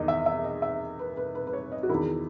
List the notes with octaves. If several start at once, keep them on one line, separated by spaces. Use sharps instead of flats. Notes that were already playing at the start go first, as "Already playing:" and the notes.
Already playing: E2 D#3 D#5
E5
E5
D#5
E5
B4
B4
B4
B4
C#5
D#5
F#4
E2 D#3 E4